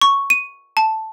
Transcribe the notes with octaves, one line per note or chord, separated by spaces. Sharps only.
C#6
D#7
A5